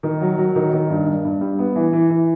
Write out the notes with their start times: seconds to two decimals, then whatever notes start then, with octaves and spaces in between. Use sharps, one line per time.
0.03 D#3
0.21 F#3
0.38 F#3
0.56 D#3
0.73 D#3
0.90 G2
1.07 G2
1.25 G2
1.41 G3
1.59 B3
1.76 E3
1.93 E3
2.10 E3